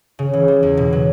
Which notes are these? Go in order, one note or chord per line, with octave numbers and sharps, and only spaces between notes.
C#3
E3
G3
E2
B2
F#3